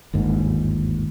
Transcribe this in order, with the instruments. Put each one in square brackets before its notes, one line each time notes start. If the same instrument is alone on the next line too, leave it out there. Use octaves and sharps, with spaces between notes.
[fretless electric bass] G1 D#2 G#2